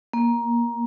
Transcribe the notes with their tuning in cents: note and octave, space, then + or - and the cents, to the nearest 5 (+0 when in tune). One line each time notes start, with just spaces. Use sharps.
A#3 +15